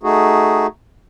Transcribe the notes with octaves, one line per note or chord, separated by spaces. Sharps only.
A3 D#4 F#4 G#4